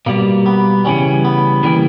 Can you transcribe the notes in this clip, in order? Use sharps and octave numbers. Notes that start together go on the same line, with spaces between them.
B2 G3 A#3
B3
C#3 E3 G3 C#4
B3
C#3 E3 G3 A#3